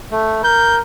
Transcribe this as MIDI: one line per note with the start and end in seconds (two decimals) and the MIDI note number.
0.11 0.42 57
0.44 0.81 70
0.44 0.76 91